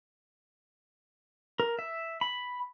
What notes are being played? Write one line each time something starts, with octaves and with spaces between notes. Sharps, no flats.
A#4
E5
B5